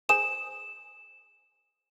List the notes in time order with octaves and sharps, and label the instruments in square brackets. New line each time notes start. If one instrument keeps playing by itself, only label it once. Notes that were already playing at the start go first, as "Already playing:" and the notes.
[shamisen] G#4 C5 G#5 [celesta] E7